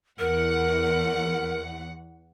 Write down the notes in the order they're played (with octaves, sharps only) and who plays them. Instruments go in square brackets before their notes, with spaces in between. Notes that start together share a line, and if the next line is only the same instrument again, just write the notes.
[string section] E2 F#5 [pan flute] A#4